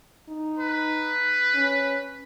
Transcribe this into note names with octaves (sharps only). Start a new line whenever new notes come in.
D#4
B4
C#4